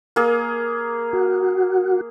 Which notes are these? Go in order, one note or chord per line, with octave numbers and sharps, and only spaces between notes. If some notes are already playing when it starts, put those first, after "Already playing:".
A#3 G#4
F#4